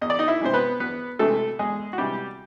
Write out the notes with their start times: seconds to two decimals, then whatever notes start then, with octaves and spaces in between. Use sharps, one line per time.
0.01 E2 D#5
0.10 D5
0.19 D#4 D#5
0.28 E4 E5
0.41 C3 E3 G#3 C5
0.54 B3 B4
0.80 E2 B3 B4
1.19 C3 E3 G#3 A3 A4
1.59 E2 G#3 G#4
1.93 F#4
1.98 C3 E3 G3 G#3 G4